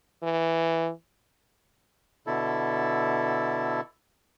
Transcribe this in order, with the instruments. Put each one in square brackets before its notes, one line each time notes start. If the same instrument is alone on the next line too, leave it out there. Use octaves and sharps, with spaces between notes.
[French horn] E3
[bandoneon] B2 D3 E4 A4